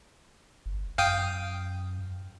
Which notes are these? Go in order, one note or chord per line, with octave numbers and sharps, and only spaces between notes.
G1
F#2 F5 G5 D#6